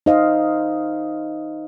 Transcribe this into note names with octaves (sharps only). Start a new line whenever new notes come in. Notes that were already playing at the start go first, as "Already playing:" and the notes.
D#4 C5 D#5 F5